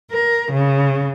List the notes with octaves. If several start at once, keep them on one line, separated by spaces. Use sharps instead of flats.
A#4
C#3